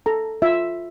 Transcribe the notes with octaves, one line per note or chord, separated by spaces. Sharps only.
A4 A#5
F4 E5